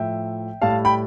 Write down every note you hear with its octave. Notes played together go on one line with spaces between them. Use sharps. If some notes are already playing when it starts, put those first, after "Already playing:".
Already playing: A2 F3 E5 G5
A2 G3 F5 A5
G5 B5